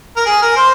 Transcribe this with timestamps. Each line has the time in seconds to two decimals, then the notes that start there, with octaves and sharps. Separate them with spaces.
0.17 A#4
0.26 G#4
0.42 A#4
0.57 C5